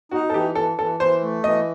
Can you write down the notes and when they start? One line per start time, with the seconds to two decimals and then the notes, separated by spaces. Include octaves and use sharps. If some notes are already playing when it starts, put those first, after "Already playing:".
0.11 D#4 F#4
0.30 A4
0.34 E3 G4
0.55 E3 A4
0.78 E3 A4
1.00 E3 C5
1.22 A3
1.43 E3 D#5